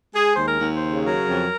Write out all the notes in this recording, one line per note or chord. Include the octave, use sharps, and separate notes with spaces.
G#3 G#4
D#2 C5
A#4
D#2
C5
C#3
F#3 A#4
F2